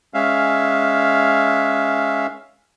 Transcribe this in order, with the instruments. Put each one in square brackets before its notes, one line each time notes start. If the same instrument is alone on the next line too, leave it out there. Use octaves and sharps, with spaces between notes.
[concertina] G#3 C#4 E5 F5